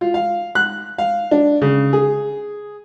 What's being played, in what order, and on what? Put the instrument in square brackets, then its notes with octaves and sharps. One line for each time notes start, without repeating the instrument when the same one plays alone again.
[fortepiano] F4
F5
F#6
F5
D4
C#3
G#4